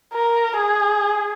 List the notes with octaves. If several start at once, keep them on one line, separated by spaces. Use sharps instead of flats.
A#4
G#4